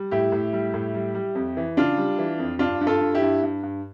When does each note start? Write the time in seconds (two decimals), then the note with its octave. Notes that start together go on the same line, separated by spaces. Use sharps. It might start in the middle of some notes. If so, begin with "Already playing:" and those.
Already playing: G3
0.11 A2 E4 G4
0.32 A2
0.53 G3
0.74 A2
0.94 G3
1.15 G3
1.35 F2
1.57 E3
1.77 C#3 D4 F4
1.97 G3
2.18 E3
2.39 F2
2.59 G2 D4 F4
2.81 G2
2.87 F4 A4
3.01 G2
3.15 E4 G4
3.22 G2
3.43 G2
3.63 G2